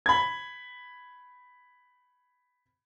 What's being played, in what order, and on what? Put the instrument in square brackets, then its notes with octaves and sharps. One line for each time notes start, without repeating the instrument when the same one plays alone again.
[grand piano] B5 G#6